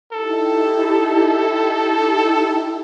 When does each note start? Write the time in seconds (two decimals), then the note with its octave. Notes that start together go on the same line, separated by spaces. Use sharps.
0.12 D#4 E4 G4 A4